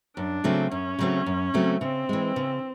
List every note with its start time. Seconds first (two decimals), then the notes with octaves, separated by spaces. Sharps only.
0.17 F#2 D4
0.44 C#3 F#3 A3 C4
0.71 F#2 C#4
0.99 C#3 F#3 A3 C4
1.26 F#2
1.54 C#3 F#3 A3 C4
1.81 C#3 C4
2.09 E3 G#3
2.36 C#3